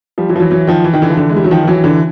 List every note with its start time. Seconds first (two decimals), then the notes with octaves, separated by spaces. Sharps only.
0.18 F3 G3
0.29 E3 F#3
0.36 F3
0.40 E3 F#3
0.51 E3 F#3
0.67 D#3 F3
0.84 E3
0.94 D#3
1.02 D3 E3
1.10 F3
1.17 D3 E3
1.29 G#3
1.36 G3
1.44 F#3
1.51 D#3 F3
1.64 F3
1.67 E3 F#3
1.84 D3 E3